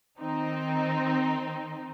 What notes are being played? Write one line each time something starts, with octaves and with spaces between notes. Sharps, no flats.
D#3 C4 D#4